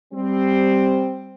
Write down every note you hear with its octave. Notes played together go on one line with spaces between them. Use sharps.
G3 C4